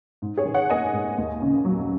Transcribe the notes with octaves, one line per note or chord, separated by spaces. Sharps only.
G#2
G#4 C#5
D#3
C#5 F#5
A#3 D#5 G#5
G#2
D#2
C#3
F#3